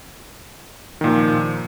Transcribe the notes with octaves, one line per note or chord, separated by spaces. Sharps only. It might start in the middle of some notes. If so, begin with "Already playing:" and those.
A#2 D#3 F3